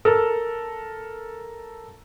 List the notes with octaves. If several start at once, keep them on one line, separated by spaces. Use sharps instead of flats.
A4 A#4